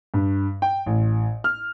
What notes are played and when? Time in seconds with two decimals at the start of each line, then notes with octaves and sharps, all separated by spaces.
0.14 G2
0.62 G5
0.86 A1
1.44 F6